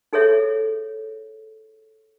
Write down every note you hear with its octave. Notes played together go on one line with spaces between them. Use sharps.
D#4 G#4 A4 C#5 E5